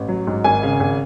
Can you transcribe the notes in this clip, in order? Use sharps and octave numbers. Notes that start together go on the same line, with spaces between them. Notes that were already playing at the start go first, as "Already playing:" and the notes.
Already playing: A1
F#3
G#2
G#1 G#5
C#3
G#1